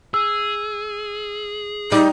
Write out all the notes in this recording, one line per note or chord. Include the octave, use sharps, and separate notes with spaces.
G#4 E6
G3 D#4